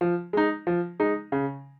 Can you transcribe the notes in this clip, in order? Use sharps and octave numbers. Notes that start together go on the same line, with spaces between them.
F3
G#3 D#4
F3
G#3 D#4
C#3